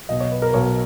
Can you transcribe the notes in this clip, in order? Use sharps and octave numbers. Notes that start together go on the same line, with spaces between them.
B1 B2 D#5
C#5
B4
A#4
B1 B2 C#5